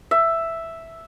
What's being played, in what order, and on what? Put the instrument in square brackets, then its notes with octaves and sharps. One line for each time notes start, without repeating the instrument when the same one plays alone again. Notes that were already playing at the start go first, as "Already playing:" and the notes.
[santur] E5